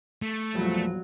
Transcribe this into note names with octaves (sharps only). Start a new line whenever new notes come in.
A3
E2 G2 A#2 F3 F#3